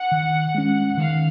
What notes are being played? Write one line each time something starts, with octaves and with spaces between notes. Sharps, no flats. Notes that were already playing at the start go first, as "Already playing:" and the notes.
Already playing: F#5
D#3
G#3 C#4
D#3 F5